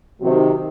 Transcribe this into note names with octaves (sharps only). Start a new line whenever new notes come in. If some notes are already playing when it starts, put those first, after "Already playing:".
C3 D#3 F#3